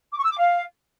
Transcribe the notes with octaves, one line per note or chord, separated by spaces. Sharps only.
D6
C#6
E6
D6
F5